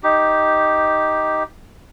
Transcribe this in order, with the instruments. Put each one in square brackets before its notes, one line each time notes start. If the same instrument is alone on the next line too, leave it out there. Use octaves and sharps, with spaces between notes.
[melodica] D#4 G4